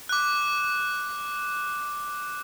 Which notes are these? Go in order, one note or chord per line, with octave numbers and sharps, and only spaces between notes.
D6 F#6